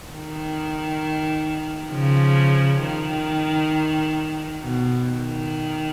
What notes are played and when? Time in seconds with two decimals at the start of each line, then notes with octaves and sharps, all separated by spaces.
0.11 D#3
1.92 C#3 F3
2.82 D#3
4.63 B2
5.08 D#3